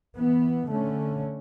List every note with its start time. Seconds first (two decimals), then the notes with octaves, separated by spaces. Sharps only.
0.16 E3 B3
0.70 D3 A3 C#4